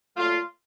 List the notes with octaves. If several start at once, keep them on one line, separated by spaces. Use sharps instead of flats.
A#2 F#3 A3 F4